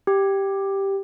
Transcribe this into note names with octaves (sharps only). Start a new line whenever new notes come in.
G4